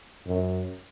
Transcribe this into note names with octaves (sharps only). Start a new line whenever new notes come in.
F#2